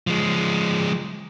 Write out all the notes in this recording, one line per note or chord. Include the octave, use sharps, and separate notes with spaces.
F3 G#3